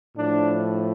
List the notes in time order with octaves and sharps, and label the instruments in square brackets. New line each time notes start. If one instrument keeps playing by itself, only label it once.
[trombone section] A2 F3 D4